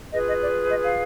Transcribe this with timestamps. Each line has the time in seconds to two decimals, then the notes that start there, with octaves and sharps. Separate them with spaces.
0.12 F4 G#4 B4 D#5
0.27 D#5
0.41 D5
0.69 D#5
0.83 F5